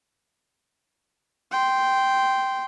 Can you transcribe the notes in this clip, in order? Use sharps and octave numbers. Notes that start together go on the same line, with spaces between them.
G5 C6